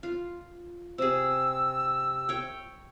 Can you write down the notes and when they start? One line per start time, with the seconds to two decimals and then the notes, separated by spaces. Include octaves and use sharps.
0.03 F4
0.98 C3 G#4 E6
2.29 C#5 G5